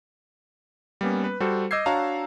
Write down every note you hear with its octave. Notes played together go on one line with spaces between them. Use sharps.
G3 A#3 B3 C#4
B4
G3 F#4 A4 C5
D#5 D6 E6 G6 G#6 C7
D4 F#4 C#5 F5 A5 A#5